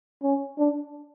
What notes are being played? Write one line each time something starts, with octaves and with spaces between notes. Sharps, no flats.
C#4
D4